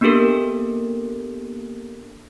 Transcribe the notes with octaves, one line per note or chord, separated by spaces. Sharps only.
A#3 B3 D4 G4 A4 A#4